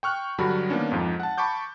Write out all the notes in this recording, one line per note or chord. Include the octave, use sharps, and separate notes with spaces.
G5 C#6 F6 F#6
G2 D3 F#3 G3 F#4 B5
D#3 A#3 B3 C#4 D4
F2 G#2 F3
F#5 A5
A5 B5 C#6 D6 G6